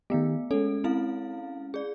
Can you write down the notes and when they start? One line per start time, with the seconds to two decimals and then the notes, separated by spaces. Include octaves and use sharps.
0.10 D#3 A3 B3 G4
0.51 G#3 C#4 A4
0.84 C4 E4 F5
1.74 G#4 D5